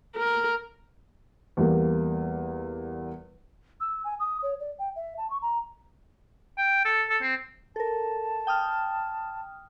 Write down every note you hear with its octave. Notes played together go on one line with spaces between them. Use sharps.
A#4
E2 G3 A#3
E6
G#5
D#6
C#5
D5
G5
E5
A5
C#6
A#5
G5
A4
A4
C4
A4 A#4 A5
G5 D#6 F6